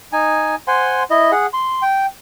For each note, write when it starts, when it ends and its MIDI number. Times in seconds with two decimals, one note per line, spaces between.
0.13 0.55 63
0.13 0.55 80
0.68 1.03 72
0.68 1.03 78
0.68 1.03 80
0.68 1.03 84
1.10 1.32 64
1.10 1.32 75
1.32 1.47 68
1.32 1.47 78
1.53 1.82 84
1.82 2.06 79